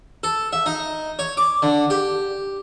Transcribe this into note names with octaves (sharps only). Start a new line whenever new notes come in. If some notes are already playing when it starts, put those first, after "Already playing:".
A4
E5
D#4
C#5
D6
D3
G4